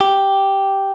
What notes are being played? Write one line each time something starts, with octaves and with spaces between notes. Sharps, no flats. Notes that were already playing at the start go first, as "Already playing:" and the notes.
G4